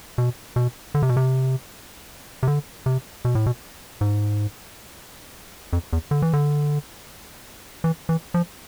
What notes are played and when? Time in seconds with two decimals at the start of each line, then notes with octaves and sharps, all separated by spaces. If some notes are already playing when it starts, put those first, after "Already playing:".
0.18 B2
0.56 B2
0.95 D3
1.02 C3
1.09 B2
1.17 C3
2.43 C3
2.47 D3
2.86 C3
3.25 B2
3.35 A2
3.46 B2
4.01 G#2
5.73 F2
5.93 E2
6.11 D3
6.22 E3
6.33 D3
7.84 E3
8.09 E3
8.34 F3